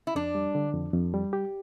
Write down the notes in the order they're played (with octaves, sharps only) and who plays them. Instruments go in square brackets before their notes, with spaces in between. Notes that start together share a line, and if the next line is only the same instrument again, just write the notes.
[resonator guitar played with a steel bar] E4
[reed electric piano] F2 [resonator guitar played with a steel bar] D4
[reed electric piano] G3
D3
F2
F2
G3
G4